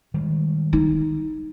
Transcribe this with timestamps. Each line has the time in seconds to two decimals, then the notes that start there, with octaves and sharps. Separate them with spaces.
0.14 D#3 G3 G#3
0.73 D#4